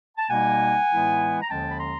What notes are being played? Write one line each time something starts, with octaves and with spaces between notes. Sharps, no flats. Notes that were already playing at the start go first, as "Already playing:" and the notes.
A5
B2 G3 A#3 D#4 F#5 G#5
A2 E3 G#3 B3 E4
A#5
D#2 D3 F3 G#3 C#4 G5 A5
B5
A#5 C6